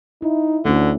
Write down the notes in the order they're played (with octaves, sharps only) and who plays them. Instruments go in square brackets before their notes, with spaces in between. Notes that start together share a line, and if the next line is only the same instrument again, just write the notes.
[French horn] D#4 [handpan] E4
[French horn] D2 [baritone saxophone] D3 [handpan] A3 C#4 E4